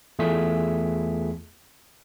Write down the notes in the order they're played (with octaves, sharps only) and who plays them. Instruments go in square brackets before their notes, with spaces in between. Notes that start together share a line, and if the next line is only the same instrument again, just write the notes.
[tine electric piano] E2 A3 F4 G#4 B6